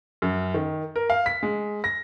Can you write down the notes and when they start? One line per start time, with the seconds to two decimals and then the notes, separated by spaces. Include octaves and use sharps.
0.22 F#2
0.54 D#3
0.96 A#4
1.10 F5
1.26 B6
1.43 G#3
1.84 A#6